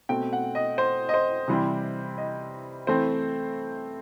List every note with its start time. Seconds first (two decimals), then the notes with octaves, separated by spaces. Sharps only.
0.09 B2 A3 C4 G5
0.33 F#5
0.55 D#5
0.78 C5
1.09 D#5
1.14 C5
1.48 C3 E3 G3 C4
2.18 D#5
2.87 E3 A3 C4 C5